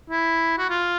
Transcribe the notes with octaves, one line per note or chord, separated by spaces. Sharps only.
E4
F#4
F4